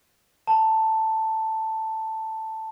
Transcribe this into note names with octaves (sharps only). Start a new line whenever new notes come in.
A5 A#5